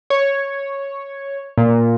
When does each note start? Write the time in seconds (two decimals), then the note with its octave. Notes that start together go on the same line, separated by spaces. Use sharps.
0.10 C#5
1.58 A#2